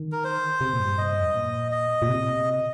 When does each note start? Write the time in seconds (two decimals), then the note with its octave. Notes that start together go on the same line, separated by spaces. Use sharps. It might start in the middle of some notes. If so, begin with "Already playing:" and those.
Already playing: D#3
0.12 A#4
0.24 C5
0.61 C3
0.73 A#2
0.79 G2
0.98 D#5
1.20 F2
1.28 G2
1.35 A#2
1.72 D#5
2.02 A#2
2.09 C3